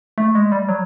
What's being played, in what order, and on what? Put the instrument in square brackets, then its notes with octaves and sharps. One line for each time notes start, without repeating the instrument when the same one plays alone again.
[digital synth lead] A3
G#3
G3
F#3